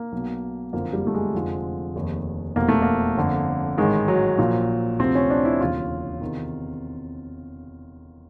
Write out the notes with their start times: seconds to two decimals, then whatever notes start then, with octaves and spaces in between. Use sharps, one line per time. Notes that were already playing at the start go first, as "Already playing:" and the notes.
Already playing: A#3
0.12 B1 B2
0.73 F#1 F2 D3 F3 A#3
0.93 G3
1.07 A3
1.14 G#3
1.34 F1 F2 D3 F3
1.95 F1 D#2 D#3
2.56 F1 E2 B2 A#3
2.69 A3
2.82 A#3
3.17 G1 F2 D3
3.78 A1 G#2 D#3 G#3
4.08 F#3
4.38 A#1 A#2 F3
4.99 D2 C3 F3 C4
5.15 C#4
5.30 D4
5.45 E4
5.60 E1 D#2 C#3 F4
6.21 E2 C3 D#3